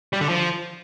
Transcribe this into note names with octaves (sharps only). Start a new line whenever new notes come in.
G3
D3
F3